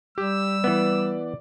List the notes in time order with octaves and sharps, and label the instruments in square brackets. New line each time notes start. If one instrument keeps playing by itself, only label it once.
[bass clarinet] G3 [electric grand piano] G4 [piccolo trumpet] E6
[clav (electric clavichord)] E3 B3 [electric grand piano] D5